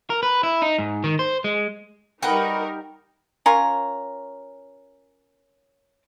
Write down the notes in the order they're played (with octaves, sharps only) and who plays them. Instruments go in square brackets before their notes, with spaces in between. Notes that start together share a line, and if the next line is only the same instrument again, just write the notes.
[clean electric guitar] A#4
B4
E4
D#4
G#2
D#3
C5
G#3
[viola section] G3 D#4 A#4 [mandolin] F#4 B4 A#5 [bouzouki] G5
[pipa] C#4 F4 A#4